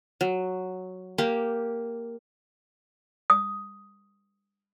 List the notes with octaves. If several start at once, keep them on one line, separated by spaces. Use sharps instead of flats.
F#3
A#3 G4
D#6